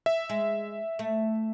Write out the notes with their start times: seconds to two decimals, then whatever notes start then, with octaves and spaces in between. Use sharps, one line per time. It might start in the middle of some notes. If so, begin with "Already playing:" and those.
0.06 E5
0.29 G#3
0.99 A3